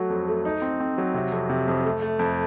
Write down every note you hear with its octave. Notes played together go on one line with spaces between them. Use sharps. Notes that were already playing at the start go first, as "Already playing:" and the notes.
Already playing: F#3 A3 F#4
F2
A3
D#4
C4
C4
F#3
C3
F2
C3
F2
A3
A3
F2